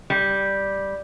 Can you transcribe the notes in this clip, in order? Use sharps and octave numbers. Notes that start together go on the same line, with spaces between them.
G3